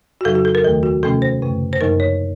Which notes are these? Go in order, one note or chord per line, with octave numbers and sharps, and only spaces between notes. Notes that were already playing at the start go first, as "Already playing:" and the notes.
F#4
F2 C#3 F#3 A4
F#4
A4
A#4
D#2 D#3 A3 A4
F#4
C3 F3 A3 C#4 A4
C5
F#2 C#3 A3
C5
F#2 F3 A#3 D#4 A#4
C#5